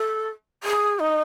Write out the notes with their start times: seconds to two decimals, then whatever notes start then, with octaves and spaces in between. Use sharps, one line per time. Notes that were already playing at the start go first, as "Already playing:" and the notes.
Already playing: A4
0.63 G#4
0.99 D#4